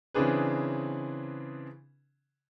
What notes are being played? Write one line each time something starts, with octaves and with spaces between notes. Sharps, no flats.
C#3 E3 C4 D4 G#4 B4